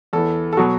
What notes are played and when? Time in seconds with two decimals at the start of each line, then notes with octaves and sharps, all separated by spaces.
0.13 E2 E3 A4
0.53 A4
0.57 B2 F#3 F#4